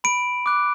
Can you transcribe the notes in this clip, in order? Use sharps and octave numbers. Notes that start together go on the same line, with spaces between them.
B5 D7
D6 F#6